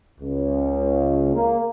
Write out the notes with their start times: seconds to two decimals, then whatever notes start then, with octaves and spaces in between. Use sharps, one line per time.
0.20 C#2
1.34 A#3